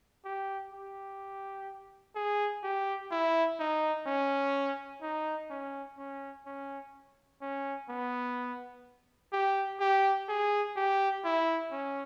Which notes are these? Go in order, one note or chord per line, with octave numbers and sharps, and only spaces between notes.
G4
G4
G#4
G4
E4
D#4
C#4
D#4
C#4
C#4
C#4
C#4
B3
G4
G4
G#4
G4
E4
C#4